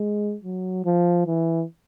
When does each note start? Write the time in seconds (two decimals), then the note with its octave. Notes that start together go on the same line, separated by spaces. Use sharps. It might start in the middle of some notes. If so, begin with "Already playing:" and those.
Already playing: G#3
0.44 F#3
0.85 F3
1.26 E3